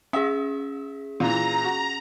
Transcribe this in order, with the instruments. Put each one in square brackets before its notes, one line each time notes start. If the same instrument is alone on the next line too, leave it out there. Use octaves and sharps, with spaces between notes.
[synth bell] C#4 G#4 [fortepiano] E5
[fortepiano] A#2 E3 [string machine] A#5
[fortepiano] F#4